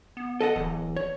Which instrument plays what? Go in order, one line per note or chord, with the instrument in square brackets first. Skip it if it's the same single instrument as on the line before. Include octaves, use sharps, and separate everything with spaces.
[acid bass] B3
[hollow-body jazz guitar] A4 D#5 F#5
[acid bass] D1 [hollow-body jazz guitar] E2
[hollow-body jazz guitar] C#5